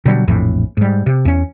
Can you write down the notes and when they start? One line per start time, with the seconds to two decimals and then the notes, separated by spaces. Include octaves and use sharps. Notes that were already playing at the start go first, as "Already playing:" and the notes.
0.05 B2 D3 F#3 G3
0.27 A#1 F2 A2 E3
0.77 G#2 G3
1.06 C3
1.25 E2 C#4